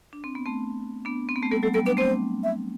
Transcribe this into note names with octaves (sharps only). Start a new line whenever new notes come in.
D4
C4
B3
A3 C4
B3 D4
C4
B3
A3 C4
G3 B3 A4
F#3 A3 A4
G3 B3 A4
B3 D4 B4
A3 C4 C5
E5